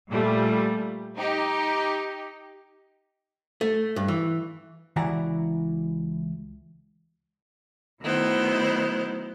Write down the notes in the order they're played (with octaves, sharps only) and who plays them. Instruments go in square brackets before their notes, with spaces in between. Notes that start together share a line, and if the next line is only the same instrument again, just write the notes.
[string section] A#2 G3 A3
D#4 G4
[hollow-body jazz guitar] A3
G2
E3
C#2 E3 E4 F#4 D5 A#5
[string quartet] D#3 F#3 A3 B3 E4 C5